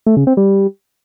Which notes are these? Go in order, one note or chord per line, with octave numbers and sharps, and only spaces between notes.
A3
C#3
C4
G3